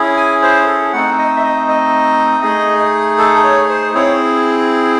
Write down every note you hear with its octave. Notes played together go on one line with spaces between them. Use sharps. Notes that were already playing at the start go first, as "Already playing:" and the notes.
Already playing: C#4 E4 G#4
G#5
C5
A4
A3 C4 D#4 F#5
D#5
E5
D#5
D#5
A3 D#4 G#4
A4
C#5
C5
C4 E4 G#4 C#5